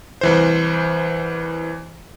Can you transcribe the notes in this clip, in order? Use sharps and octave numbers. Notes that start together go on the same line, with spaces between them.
C2 E3 C5